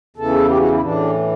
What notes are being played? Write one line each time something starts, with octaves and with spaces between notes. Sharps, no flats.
E2 C#3 E3 A4
G4
F#4
E4
A2 E3 D4